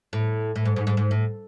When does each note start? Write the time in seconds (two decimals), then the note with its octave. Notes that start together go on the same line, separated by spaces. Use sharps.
0.13 A2
0.56 A2
0.66 G#2
0.76 G#2
0.87 G#2
0.97 G#2
1.11 A2